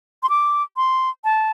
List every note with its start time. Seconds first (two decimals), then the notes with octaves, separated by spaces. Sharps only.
0.23 C6
0.29 D6
0.77 C6
1.24 A5